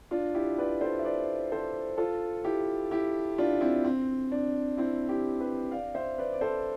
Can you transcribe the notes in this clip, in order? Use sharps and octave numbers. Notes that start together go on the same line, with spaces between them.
D4 F4
E4 G4
B4 D5
A4 C5
E5
B4 D5
A4 C5
F4 A4
E4 G4
E4 G4
D4 F4
C4 E4
C4
D4
C4 E4
E4 G4
G4 B4
D5 F5
C5 E5
B4 D5
D5
A4 C5